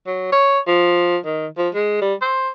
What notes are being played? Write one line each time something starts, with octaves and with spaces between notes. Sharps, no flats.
F#3
C#5
F3
D#3
F3
G#3
G3
C5